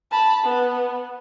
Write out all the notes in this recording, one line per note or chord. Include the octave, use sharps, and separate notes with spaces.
A5 B5
B3